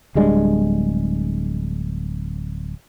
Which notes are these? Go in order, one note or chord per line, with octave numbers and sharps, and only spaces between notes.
D1 G3 G#3 D4